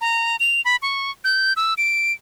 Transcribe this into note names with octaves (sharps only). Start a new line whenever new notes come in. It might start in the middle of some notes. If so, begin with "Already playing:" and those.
A#5
F7
B5
C#6
G6
E6
D7